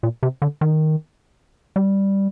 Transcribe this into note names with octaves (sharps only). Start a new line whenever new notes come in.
A#2
C3
D3
D#3
G3